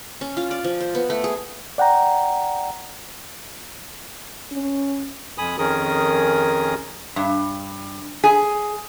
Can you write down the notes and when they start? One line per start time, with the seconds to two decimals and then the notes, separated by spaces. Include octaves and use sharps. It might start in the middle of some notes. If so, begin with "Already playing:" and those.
0.21 C#4
0.37 F4
0.51 D5
0.64 F3
0.80 C5
0.95 B3
1.10 A3
1.24 G#4
1.78 D5 F#5 G5 A#5
4.52 C#4
5.38 F2 G#5 B5 D#6
5.59 F2 D#3 C#4 G#4 A#4 D#6
7.16 G2
8.24 G#4